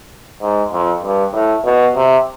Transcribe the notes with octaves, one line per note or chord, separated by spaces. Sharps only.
G#2
F2
G2
A2
B2
C3